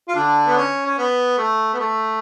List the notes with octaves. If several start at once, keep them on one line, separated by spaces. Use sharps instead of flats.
F4
D3 D4
B3
C#4
C#4
B3
A3
B3
A3